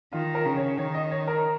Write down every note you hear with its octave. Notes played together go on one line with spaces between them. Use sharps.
D#3 F4
A#4
C#3
C#5
D#3 C#5
D#5
C#5
A#4